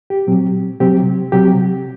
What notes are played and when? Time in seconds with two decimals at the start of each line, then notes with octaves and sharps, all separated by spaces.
0.10 G4
0.27 A#2 F#3 C4
0.80 C3 F#3 C4 G4
1.32 C3 F#3 C4 G4